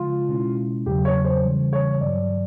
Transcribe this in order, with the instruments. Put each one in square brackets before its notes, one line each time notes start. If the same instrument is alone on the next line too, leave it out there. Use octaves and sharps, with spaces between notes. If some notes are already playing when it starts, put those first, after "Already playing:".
Already playing: [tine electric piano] C#3 F3 G#3 [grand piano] F4
[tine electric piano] B2 G#3 C#4 E4
[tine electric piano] E2 C#3 F#3 [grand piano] G4
[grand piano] C#5
C5
[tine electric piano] C#3 E3 G3
[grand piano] C#5
[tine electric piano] G2 D#3 F#3 [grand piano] D5